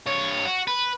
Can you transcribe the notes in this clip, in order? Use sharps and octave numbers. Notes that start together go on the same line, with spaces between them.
G2 C#5
F#4
B4